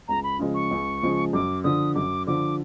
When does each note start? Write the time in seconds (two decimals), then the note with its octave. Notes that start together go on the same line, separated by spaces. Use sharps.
0.08 C#2 A#5
0.23 B5
0.39 C#3 F3 G#3
0.55 C#6
0.71 C#2
1.02 C#3 F3 G#3
1.33 F#2 D6
1.64 D3 F3 D#6
1.95 F#2 D6
2.27 D3 F3 D6